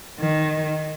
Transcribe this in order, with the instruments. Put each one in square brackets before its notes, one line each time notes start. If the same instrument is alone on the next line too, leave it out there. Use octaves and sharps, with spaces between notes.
[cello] D#3